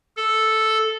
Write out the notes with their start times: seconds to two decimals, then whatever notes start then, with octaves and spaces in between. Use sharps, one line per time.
0.17 A4